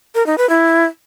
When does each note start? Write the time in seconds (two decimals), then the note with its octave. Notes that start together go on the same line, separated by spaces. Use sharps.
0.15 A#4
0.26 D#4
0.38 B4
0.49 E4